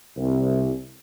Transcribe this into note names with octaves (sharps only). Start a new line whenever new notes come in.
C2